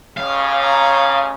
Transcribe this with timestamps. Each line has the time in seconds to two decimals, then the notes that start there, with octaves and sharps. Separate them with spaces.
0.17 A1 C#3 F5
0.63 A#5